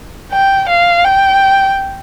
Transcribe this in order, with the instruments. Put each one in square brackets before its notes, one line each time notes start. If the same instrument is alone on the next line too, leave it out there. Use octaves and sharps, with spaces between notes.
[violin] G5
F5
G5